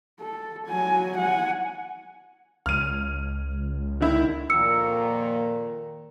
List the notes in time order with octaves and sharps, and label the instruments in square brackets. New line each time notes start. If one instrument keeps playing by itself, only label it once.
[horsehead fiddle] A4
F#3 G#5
F#5 G#5
[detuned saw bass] C#2 [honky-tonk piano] F6 D#7
[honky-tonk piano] D3 D#3 E4
[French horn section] F2 A#2 A#3 [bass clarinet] D#3 [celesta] E6 C#7